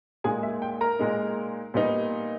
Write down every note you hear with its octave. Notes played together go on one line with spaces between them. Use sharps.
A#2 G#3 D#4 G#4 G#5
E5
G5
A#4 A#5
A#2 G#3 D#4
A#2 G3 B3 D#4